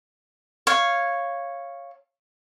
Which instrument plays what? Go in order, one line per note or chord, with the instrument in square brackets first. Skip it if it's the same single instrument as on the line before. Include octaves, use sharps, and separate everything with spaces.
[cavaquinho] C#5 F5